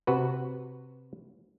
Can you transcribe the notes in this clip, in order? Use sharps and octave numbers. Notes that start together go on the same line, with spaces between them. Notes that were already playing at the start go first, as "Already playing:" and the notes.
C3 F#4 B4